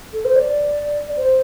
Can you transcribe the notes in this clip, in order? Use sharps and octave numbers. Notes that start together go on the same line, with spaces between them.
A4
C5
D5
C5